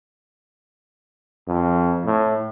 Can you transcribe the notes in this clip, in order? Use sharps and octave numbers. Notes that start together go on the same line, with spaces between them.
F2
A2